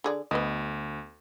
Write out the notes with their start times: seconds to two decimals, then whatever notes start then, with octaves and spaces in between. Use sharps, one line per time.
0.04 D3 G#4 D5
0.31 D2 B3 B4 D#5